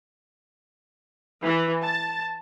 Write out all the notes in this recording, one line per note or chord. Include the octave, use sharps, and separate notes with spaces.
E3
A5